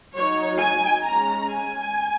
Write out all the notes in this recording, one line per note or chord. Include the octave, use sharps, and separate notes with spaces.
F#3 D#4 C#5
G#5
G#3 C#4 A#5
G#5